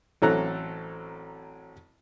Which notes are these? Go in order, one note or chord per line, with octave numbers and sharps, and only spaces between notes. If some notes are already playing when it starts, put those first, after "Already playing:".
A1 F#3 C4 A4 A#5 F#6